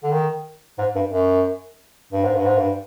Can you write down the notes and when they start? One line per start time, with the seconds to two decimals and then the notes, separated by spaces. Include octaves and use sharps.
0.03 D3
0.11 D#3
0.78 G#2
0.95 G2
1.12 F#2
2.13 G2
2.24 G#2
2.35 G2
2.46 G#2
2.58 G2